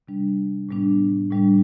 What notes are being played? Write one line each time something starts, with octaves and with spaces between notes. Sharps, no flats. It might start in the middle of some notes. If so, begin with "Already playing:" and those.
C3 G3 D4
A2 G3 B3 D4
A2 G3 D4